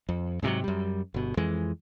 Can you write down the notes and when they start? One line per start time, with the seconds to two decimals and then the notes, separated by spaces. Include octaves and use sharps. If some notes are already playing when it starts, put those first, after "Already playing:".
0.09 F2
0.42 G#2 C3 E3 F#3
0.64 F#2 G3
1.14 G1 B2
1.37 F2 E3 G#3